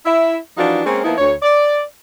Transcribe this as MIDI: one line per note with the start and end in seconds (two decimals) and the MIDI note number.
0.06 0.37 64
0.06 0.37 76
0.58 0.82 52
0.58 0.82 53
0.58 0.82 62
0.58 0.82 63
0.58 0.82 65
0.58 0.82 66
0.86 1.02 56
0.86 1.02 58
0.86 1.02 60
0.86 1.02 61
1.05 1.15 53
1.05 1.15 58
1.05 1.15 59
1.05 1.15 63
1.05 1.15 64
1.18 1.34 38
1.18 1.34 73
1.43 1.82 74